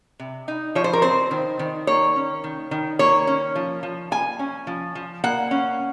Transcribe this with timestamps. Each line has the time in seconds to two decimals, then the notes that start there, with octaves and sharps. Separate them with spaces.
0.20 C3
0.48 D#4
0.75 F3 C#5
0.84 C5
0.93 A#4
1.02 C4 C5
1.31 D#3
1.59 D#3
1.87 A#3 C#5
2.16 C#4
2.44 D#3
2.71 D#3
2.99 A#3 C#5
3.27 C#4
3.56 F3
3.83 F3
4.11 A#3 G#5
4.39 C#4
4.67 F3
4.95 F3
5.24 A#3 F#5
5.51 C#4